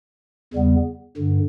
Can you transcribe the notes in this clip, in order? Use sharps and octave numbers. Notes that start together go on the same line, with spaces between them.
E2 C#3 G3 B3
G2 D3